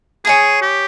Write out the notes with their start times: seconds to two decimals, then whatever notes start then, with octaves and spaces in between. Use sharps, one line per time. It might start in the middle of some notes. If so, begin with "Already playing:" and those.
0.25 G#4 C#5 G#5 D#6
0.62 G4